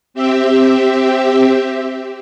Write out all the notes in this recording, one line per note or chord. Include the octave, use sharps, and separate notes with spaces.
C4 G4 E5